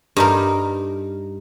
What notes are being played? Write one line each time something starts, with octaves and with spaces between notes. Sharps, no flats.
G2 D#4 A#4